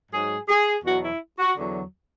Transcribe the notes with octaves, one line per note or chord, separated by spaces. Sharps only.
G#2 F#3 G#4
G#4
E2 B2 F#3 F#4
E4
F#4
E2 D3 F#3